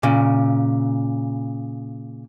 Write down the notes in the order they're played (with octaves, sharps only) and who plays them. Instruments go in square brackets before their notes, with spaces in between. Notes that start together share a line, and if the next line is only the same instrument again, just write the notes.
[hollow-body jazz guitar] A#2 C#3